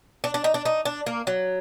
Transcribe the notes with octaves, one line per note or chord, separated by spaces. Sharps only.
D4
D4
D#4
D4
D#4
D4
A#3
F#3